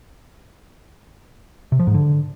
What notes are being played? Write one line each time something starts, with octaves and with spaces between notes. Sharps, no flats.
C3
F3
G#2
D3